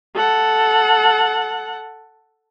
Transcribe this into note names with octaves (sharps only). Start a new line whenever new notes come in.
A4 F#5